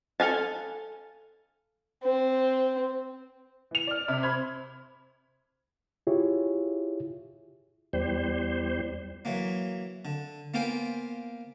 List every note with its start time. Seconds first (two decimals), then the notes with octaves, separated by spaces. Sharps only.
0.20 A4 F5 G#5 A5
2.03 C4
3.71 E3 F7
3.87 D5 F6
4.08 C3
4.23 C5 B5 G#6
6.07 E4 F4 G4 G#4 C#5 E5
7.93 E2 G3 C5
9.25 E3 F#3 A#3
10.05 D3
10.54 A#3 B3 F4 C5 G5 G#5